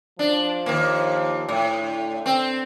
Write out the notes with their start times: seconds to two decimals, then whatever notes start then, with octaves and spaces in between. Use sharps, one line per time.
0.19 F3 D4
0.66 D#2 A#3
1.49 A2
1.80 D3
2.26 C4